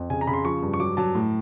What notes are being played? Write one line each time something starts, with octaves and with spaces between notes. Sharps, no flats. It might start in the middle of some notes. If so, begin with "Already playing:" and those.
Already playing: F2
C#3 G#5
A#5
C#3 B5
C6
F3 C#6
G2
C#6
F#3 D6
F#3 A5
A2